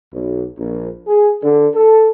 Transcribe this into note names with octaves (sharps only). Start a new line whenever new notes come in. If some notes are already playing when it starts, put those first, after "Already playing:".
B1
A#1
G#4
D3
A4